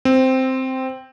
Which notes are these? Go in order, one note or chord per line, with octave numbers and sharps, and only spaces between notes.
C4